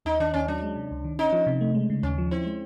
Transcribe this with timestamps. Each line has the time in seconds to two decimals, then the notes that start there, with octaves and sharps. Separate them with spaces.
0.05 D#2 D#4
0.20 D#3 D4
0.34 D#2 C#4
0.48 F#3 D4
0.63 G#3
0.76 C3
0.91 C#2
1.04 D#3
1.19 C#4 D#4
1.32 F3
1.46 C3
1.61 A3
1.75 G#3
1.90 C#3
2.03 D#2 C#4
2.18 F3
2.31 C4 E4
2.46 G#3